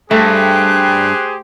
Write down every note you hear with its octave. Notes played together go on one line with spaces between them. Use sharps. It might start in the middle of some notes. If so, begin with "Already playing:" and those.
G2 A3 G4 G#4 C5 F#6